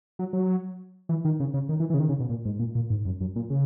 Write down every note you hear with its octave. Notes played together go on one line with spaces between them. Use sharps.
F#3
F#3
E3
D#3
C#3
C#3
D#3
E3
E3
C#3
D#3
C#3
B2
A#2
G#2
A#2
A#2
G#2
F#2
F#2
A#2
C#3